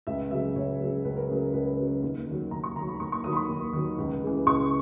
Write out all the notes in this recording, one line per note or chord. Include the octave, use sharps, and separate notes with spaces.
C#2 E5
C#3 F#3 E5
C#2 C#5
C#3 F#3
C#2 B4
A#4
C#3 F#3 G#4
A#4
C#2 B4
C#3 F#3
D#2
D#3 F#3
D#2 A#5
C#6
D#3 A#5
F#3
B5
D#2 C#6
C#6
D#3 F#3 D#6
B5
C#6
D#2
D#3 F#3
C#2
C#3 E3
C#2 C#6